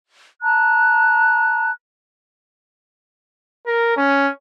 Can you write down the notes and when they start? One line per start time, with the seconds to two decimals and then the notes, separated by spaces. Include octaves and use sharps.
0.42 A5 A#5 F#6
3.66 A#4
3.97 C#4